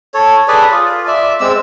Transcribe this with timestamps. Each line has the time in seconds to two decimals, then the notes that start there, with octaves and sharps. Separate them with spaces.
0.14 A4 C#5
0.48 G#4 A4 B4 D5
0.71 F4
1.07 D5 E5
1.40 G#3 C4 E6